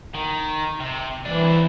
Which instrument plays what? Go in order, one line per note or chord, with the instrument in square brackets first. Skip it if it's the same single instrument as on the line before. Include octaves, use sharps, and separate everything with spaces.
[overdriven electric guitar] D#3
C3
[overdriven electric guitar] C2 D4 [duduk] E3
[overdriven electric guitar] C4 E4